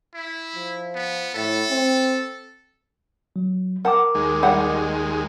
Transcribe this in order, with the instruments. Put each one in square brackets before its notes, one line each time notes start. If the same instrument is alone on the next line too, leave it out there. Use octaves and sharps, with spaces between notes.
[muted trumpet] E4
[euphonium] F3
[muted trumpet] B3
[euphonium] A2 [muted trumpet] A4
[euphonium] C4
[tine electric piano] F#3
[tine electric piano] A#4 D6 [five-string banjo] F#5 A5
[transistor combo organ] D#2 G#3
[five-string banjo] G3 F#5